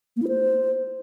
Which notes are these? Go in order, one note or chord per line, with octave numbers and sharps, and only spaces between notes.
A#3
E4
C5